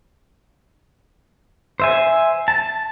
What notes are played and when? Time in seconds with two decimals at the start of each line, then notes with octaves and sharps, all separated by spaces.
1.80 C5 E5 G#5
2.48 A5